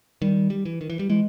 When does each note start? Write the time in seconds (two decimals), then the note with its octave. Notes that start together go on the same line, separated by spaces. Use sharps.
0.22 D#3 G3
0.50 G3
0.65 E3
0.81 D#3
0.90 E3
0.99 G3
1.09 E3 G#3